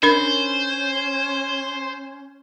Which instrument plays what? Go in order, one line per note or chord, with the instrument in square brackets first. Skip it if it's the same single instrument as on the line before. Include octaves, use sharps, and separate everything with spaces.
[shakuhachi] C#4 [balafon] D4 A#4 B5 [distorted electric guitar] C5